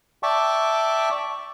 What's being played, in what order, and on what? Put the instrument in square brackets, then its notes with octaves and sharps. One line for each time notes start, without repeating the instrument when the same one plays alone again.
[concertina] D5 E5 G5 A5 C#6 D6